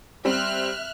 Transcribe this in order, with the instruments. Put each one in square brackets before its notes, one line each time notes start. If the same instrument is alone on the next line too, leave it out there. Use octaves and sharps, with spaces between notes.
[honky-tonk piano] G3 C4 [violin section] E5 F6 F#6